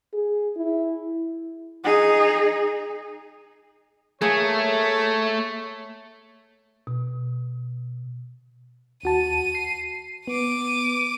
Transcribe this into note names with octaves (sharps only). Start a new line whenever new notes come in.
G#4
E4
D#4 G#4
A3 A#3 G#4 C#5
B2
D#2 F#4 A5 D#7
C7
B3 D6 D#7